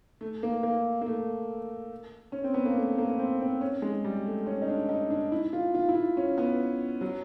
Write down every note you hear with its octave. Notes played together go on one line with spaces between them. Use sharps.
A3
A#3
A#3
A#3
A3
C#4
C4
B3
A#3
A3
A#3
C4
C4
C#4
G#3
G3
A3
C#4
D#4
D4
D#4
D4
E4
F4
F4
E4
F4
C#4
B3
F#3